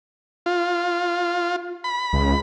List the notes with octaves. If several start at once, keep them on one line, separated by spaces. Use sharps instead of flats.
F4
B5
C#2